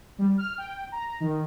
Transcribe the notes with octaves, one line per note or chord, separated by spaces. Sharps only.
G3
F6
G5
A#5
D#3